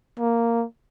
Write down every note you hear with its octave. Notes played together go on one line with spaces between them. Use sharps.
A#3